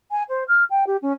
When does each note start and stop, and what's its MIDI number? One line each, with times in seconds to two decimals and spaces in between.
0.11 0.23 80
0.28 0.43 72
0.48 0.63 89
0.70 0.84 79
0.86 0.96 67
1.02 1.12 61